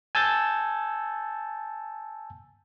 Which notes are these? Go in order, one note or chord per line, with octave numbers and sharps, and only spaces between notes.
G#5 A5 E6 G6 A6